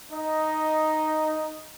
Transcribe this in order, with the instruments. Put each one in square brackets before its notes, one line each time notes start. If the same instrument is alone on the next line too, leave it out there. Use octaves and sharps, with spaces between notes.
[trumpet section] D#4 D#5